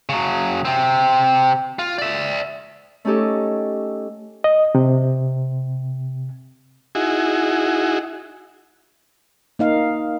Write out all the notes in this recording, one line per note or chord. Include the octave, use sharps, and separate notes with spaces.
C#3 F#3
C3 C4
F4
D5 E5
A3 C#4 D#4 G4 A4
D#5
C3
D#4 E4 F#4 G#4
A#3 D#4 F5